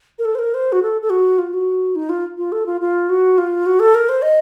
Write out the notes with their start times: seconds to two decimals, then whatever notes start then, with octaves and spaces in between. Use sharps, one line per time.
0.19 A#4
0.25 A4
0.35 C5
0.39 A#4
0.54 C5
0.72 F#4
0.83 A4
1.02 A4
1.10 F#4
1.38 F4
1.53 F#4
1.96 D#4
2.09 F4
2.38 F4
2.52 A4
2.66 F4
2.81 F4
3.09 F#4
3.38 F4
3.66 F#4
3.80 A4
3.95 A#4
4.09 C5
4.22 D#5